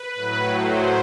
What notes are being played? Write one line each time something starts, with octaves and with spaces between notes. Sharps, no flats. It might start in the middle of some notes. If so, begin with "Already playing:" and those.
Already playing: B4
A2 F#3
C5